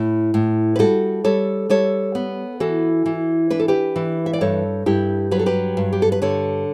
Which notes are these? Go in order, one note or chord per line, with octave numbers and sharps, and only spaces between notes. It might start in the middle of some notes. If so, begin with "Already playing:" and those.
Already playing: A2
A2
B4
G3 F#4 A4
G3 A4 C#5
G3 A4 C#5
B3
E3 F#4 A4
E3
D4 B4
A4
G4 B4
E3
E5
D5
G2 A4 C#5
G2 E4 G4
F#3 B4
A4
G4 B4
G2
G4
A4
B4
D3 A4 C#5